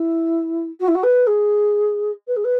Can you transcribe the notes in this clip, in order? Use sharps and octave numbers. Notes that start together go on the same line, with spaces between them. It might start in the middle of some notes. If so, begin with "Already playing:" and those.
Already playing: E4
F#4
E4
F#4
B4
G#4
B4
G#4
B4